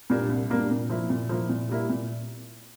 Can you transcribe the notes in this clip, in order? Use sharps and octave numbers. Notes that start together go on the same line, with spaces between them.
A#2 G3 A#3 D4
C2
A#2 G3 A#3 D4
A#2
F3 A#3 E4
A#2
F3 A#3 E4
A#2
G3 A#3 E4
A#2